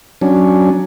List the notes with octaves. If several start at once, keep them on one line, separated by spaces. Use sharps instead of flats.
F#3 C#4 D4